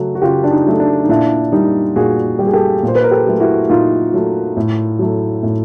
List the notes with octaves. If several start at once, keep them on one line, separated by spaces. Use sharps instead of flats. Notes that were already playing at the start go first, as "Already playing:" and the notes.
Already playing: C#3 F#3 A3 F#4
F#4
C#3 F4 G4
D4
D#4
F#3 A3
D4
D#4
A#2 D4 E4
G3 D#4
A#2 F#4 G#4
G3 G4
G#4
G4 A4
A#2
C5
B4
A#4
G4 A4
F#3 A3
E4 F#4
A#2 D#4 F4
F#3 A3
A2
F#3 A3
A2